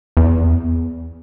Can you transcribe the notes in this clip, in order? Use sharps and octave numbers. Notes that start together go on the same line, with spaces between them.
E2